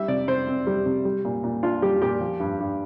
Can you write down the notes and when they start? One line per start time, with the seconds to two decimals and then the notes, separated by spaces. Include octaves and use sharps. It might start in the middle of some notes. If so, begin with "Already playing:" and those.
Already playing: G3 E5
0.08 C3 D5
0.28 C3 C5
0.47 C4
0.67 G3
0.86 C3
1.05 G3
1.25 A#2
1.44 A#2
1.63 D4 F4
1.82 G3 G4
2.02 A#2 G4
2.20 F3
2.40 G2
2.60 G2